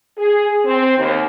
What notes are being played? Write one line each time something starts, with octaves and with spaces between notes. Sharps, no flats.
G#4
C4
D#2